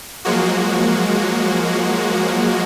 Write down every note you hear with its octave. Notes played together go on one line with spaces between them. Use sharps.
F3 F#3 G#3 A#3 F#4